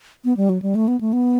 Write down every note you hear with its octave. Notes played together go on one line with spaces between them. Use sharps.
B3
G3
F#3
G3
A3
B3
A3
B3